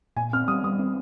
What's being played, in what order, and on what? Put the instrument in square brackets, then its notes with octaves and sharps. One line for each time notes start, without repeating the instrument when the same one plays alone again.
[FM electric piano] A#2 [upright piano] G#5
[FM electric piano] C4 [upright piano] F6
[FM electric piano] G3 [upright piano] D#6
[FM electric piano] G3 [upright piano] D#6
[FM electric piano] C4